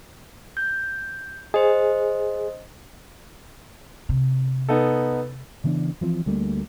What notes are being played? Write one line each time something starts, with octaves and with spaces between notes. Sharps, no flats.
G6
G#4 C5 D#5
C3
B3 D#4 A4
C#3 E3 B3 D4
E3 F3 A#3 C4
D2 G3 A3 A#3